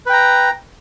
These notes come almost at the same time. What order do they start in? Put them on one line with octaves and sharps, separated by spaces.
B4 G5 A#5